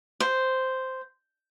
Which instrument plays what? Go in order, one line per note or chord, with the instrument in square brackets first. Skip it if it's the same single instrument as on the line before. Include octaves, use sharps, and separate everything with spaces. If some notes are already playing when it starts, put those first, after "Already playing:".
[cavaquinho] C5